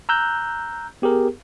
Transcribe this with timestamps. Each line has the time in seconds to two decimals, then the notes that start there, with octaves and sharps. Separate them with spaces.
0.09 A#5 E6 F#6 G6
1.02 B3 G4 G#4 A#4